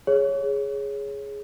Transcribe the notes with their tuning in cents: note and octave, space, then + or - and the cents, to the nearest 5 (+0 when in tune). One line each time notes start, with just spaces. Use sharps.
G#4 +0 C#5 +0